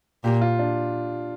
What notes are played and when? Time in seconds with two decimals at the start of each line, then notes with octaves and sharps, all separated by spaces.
0.24 A#2 G4
0.41 F4
0.59 D4